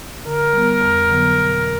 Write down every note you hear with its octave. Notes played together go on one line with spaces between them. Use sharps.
D3 A#4
G3 B3
F2
D3 F#3 B3
B2